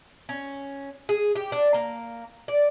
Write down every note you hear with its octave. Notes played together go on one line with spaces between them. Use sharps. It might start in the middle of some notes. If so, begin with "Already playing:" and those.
C#4
G#4
G4
D4
A#3
D5